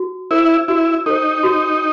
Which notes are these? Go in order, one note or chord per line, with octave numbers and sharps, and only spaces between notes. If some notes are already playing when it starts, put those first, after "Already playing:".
Already playing: F#4
E4 A4 C5
E4 F#4
D#4 A4 C5
F#4